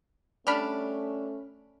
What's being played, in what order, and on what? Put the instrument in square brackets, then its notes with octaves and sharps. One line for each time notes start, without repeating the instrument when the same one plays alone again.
[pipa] G3 D4 [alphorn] A3 [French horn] C#4 [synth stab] B5 F6